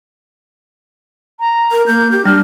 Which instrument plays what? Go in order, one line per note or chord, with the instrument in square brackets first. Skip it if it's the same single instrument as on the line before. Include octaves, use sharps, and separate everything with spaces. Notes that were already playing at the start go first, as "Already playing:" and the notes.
[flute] A#5
[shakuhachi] A#4
[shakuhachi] A#3 [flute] G6
[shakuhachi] G4 [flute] G6
[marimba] G3 [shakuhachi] D4 [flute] F6